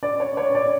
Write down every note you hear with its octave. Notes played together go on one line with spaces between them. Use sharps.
D5
C#5
C#5
D5